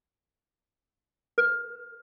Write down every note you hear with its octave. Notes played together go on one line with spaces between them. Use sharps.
B4